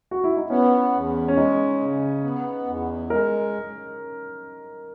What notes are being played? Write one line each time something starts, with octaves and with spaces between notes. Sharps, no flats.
F#4
E4
D#4
B3 C#4
E2
C#4
G#3 D#4
C#3
B3
E2
G#3 A#4